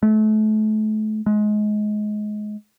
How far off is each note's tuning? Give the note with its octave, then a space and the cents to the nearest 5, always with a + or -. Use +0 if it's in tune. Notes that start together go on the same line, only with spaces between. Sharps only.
A3 -35
G#3 +25